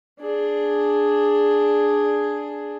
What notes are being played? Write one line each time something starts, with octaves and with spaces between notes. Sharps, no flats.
D4 G#4